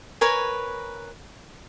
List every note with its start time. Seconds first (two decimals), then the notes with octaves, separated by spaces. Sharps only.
0.21 A#4 B4 C#5 G#5